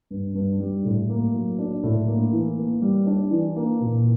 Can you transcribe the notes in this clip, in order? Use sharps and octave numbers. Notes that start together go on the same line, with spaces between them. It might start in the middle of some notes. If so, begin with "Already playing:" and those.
G2
G2
G3
A2
A#3
F#3
D4
A2
A#3
E3
A#3
G3
D4
E3
A#3
A#2